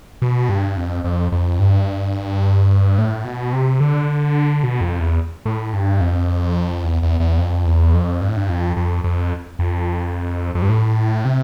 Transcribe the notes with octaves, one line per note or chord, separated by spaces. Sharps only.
B2
G2
F2
F2
F2
G2
A2
B2
C3
D3
B2
F2
E2
A2
G2
F2
E2
E2
E2
F2
E2
F2
G2
A2
G2
F2
F2
F2
F2
F2
G2
A2
C3